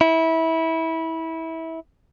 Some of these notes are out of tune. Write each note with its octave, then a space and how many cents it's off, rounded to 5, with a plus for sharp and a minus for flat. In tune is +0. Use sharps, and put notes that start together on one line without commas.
E4 -20